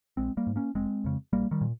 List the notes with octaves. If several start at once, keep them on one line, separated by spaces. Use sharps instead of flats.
A#1 G#3 C4
G3 A#3
G#2
A#3 C#4
F1 G#3 C4
F2 C#3
A#1 G3 A#3
D#3 G3
A#2